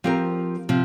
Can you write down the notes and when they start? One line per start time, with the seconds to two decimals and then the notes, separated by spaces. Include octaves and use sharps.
0.04 F3 C4 G4 A#4
0.69 C3 F3